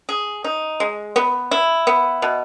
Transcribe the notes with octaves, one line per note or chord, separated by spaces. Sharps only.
G#4
D#4
G#3
B3
E4
B3
B2